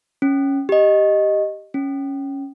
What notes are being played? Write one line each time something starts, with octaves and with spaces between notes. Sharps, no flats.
C#4
G4 D#5
C#4